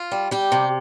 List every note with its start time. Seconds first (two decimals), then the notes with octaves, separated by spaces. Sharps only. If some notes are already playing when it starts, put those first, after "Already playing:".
Already playing: F4
0.12 G3
0.31 G3 G4
0.52 C3